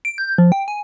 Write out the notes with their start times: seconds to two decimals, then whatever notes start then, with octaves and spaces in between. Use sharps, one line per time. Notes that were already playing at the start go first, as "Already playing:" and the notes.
0.05 D7
0.18 G6
0.38 F3
0.52 G5
0.68 G#5